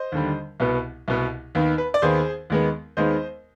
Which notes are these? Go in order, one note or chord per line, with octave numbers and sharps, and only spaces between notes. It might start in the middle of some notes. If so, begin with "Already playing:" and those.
Already playing: C5 D#5
D#2 D3 G3
C2 B2 B3
C2 B2 B3
D#2 D#3 B3
B4
D5
D#2 D#3 B3 G#4 C5
D#2 D#3 G#3 B3
D#2 D#3 G#3 B3 C5 D#5